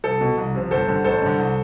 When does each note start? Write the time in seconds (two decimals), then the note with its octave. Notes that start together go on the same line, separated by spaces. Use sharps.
0.04 C2 A4
0.21 B2
0.37 C2
0.54 C3 F3
0.71 G1 A4 C5
0.88 G2 D3
1.04 A1 A4 C5
1.22 G2 D3
1.38 C2